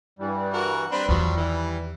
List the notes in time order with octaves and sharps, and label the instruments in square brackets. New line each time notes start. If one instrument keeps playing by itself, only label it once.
[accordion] G2 E3 G3
[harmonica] F#4 A#4
[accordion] G3 [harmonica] C4 D4 B4
[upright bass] E2 D#3 [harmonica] F3 F#3
[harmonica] E3